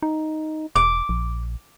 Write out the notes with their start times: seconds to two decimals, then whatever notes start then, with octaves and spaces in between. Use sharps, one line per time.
0.03 D#4
0.76 E1 D6
1.09 A#1